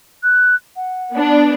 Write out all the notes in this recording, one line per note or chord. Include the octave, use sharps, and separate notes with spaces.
F#6
F#5
B3 D4